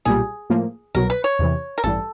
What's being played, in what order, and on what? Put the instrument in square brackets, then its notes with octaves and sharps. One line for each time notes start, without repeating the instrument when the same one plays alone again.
[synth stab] B1 A#2 G3 [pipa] G#4
[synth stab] A2 F3 A#3
[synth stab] C2 B2 F#3 [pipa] A#4
[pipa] B4
C#5
[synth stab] E2 C3 E3
[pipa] A#4
[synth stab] A1 G2 E3 G3 [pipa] A4